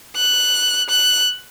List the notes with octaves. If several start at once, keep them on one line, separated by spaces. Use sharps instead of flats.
F#6
F#6